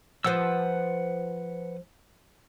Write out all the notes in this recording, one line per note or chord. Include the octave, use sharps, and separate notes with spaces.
F3 B4 C5 F#5 E6